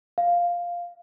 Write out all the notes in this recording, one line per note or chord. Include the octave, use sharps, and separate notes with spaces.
F5